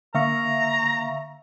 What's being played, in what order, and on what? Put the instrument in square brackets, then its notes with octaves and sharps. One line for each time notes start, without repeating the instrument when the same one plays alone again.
[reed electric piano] D3 A#3 [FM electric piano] E5 F5 C#6 [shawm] A#5